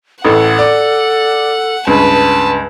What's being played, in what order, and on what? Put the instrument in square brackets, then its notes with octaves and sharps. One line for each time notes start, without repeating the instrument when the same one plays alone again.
[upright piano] A1 A2 [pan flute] A4 [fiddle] F#5
[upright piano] D5
[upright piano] C#2 G2 [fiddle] B4 A5